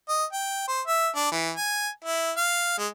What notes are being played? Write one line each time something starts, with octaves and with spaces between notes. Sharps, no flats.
D#5
G5
C5
E5
D4
E3
G#5
E4
F5
G#3